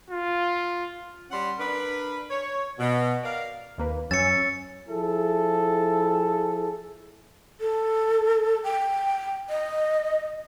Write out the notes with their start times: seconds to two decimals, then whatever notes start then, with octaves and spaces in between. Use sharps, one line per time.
0.10 F4
1.29 G3 C#4 F#5 C6
1.58 D4 A#4 B4
2.30 C#5
2.79 B2
3.23 A#4 D5 F5
3.78 D#2 A#3 B4
4.11 F#2 C#4 C#5 G#5 E6 A6 C#7
4.89 F3 E4 G#4 A4
7.60 A4
8.64 G5
9.50 D#5